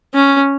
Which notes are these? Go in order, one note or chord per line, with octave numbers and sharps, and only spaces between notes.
C#4